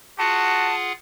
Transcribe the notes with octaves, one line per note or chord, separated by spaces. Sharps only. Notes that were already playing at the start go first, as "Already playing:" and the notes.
F4 F#4 G#4 F#5 A5